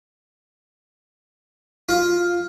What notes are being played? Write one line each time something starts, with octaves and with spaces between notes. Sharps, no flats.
F4